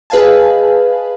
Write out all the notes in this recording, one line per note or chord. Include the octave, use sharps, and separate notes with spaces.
G#4 B4 D#5 F5 G#5 A5